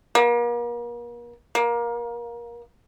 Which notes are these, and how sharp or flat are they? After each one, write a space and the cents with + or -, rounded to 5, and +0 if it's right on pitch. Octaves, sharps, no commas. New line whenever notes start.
A#3 +40
A#3 +25